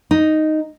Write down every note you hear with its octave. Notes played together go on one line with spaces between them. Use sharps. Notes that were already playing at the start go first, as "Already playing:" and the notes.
D#4